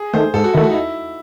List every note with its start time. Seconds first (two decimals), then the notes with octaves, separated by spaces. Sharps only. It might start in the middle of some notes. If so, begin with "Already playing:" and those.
Already playing: G#4
0.13 D#3 A3 C5
0.34 G#2 A4
0.44 F#4
0.53 D#3 A3 E4
0.64 F#4
0.70 D#4
0.74 E4